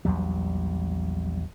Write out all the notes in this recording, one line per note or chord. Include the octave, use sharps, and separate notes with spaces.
A#1 E2 F#3 G3